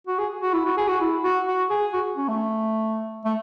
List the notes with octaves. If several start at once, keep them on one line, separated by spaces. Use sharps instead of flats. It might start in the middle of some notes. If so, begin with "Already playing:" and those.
F#4
G#4
F#4
E4
F#4
G#4
F#4
E4
F#4
F#4
G#4
F#4
C#4
A3
A3